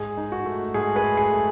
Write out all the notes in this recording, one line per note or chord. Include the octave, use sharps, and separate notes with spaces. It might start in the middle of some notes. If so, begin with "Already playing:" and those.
Already playing: G#2 G#4
D#4
F#4
A3
G#2 G#4
G#4 B4
A3
G#4
A3